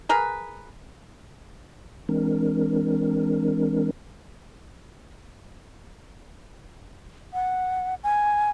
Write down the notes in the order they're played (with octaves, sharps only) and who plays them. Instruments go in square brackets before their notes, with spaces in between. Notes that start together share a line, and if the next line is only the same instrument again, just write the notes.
[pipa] G#4 A#4 B4
[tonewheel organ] E3 G#3 C4 D4 A#4
[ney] F#5
G#5